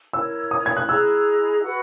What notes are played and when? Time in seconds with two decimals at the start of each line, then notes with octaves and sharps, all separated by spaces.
0.13 E4 A#4 C#5 E6
0.51 D#6
0.66 G#6
0.77 F#6
0.88 E4 G#4 D#5 A#5 E6
1.63 F#4 B4 F#5 B5